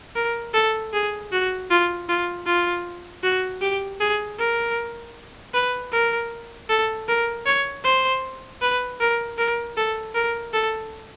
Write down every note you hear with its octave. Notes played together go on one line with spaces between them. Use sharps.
A#4
A4
G#4
F#4
F4
F4
F4
F#4
G4
G#4
A#4
B4
A#4
A4
A#4
C#5
C5
B4
A#4
A#4
A4
A#4
A4